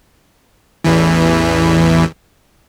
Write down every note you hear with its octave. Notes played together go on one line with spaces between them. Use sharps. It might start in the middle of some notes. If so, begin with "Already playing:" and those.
A1 E2 E3